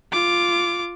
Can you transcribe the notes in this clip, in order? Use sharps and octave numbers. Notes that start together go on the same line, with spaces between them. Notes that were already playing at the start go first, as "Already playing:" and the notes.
F4 D6